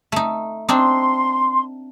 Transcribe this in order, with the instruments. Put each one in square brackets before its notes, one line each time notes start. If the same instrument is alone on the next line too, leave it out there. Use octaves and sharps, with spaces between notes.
[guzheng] A3 D#4
[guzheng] C4 D4 D#4 [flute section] C6